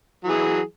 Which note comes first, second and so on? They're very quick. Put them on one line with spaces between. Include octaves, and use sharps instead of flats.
F#3 E3 G#4